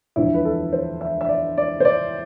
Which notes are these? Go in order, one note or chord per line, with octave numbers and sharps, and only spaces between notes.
E1 D2 D3 F3 E4
B4
A4
C5
E5
E5
D5
D5
C5
D5